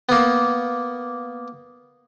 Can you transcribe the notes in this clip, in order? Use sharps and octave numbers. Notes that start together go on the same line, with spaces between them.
A#3 B3